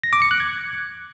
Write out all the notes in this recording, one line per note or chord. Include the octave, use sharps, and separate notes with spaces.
A#6
D6
C#7
F#6
G#6